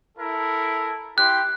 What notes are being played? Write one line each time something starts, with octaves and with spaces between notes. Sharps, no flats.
E4 A4 A#4
E4 G4 C6 F#6